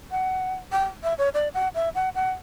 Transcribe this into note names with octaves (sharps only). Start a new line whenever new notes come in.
F#5
G5
E5
C#5
D5
F#5
E5
F#5
F#5